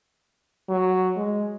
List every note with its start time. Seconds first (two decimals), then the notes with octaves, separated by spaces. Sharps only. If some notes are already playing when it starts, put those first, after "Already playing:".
0.69 F#3
1.17 G#3